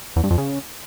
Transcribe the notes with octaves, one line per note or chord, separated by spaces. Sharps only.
E2
G2
F2
C#3